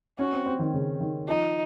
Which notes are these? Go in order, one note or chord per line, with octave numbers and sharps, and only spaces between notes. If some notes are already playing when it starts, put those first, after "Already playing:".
C#4 F#4
C4
C4
D#3
C#3
D#3
F3 D#4